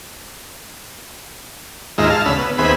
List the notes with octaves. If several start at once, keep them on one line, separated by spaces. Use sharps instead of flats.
D#2 G#2 G#3 F4 E5 A#5
F5 A5
D2 C#3 B5 E6
B3
D#2 B3 C4 G#4 E5 B5